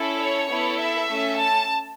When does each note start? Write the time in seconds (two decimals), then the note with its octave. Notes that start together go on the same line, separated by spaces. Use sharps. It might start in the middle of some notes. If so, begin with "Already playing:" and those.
Already playing: C#4 E4 A4
0.20 C#5
0.49 B3 E4 A4
0.80 E5
1.09 A3 C#4 A4
1.38 A5